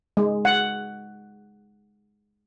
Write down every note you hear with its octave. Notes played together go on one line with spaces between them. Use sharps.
G#3
F#5